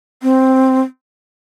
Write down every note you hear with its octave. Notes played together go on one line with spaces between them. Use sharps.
C4